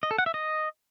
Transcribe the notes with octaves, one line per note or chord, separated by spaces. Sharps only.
D#5
A4
F#5
E5
D#5